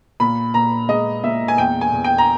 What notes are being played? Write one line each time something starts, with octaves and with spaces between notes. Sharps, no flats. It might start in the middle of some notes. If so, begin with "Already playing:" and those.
A#2 B5
A#2 A#5
G#3 D#5
A#2 E5
G#5
E2 G5
G#5
E2
G5
A#5